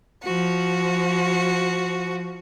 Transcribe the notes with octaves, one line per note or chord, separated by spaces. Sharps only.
F3 F#4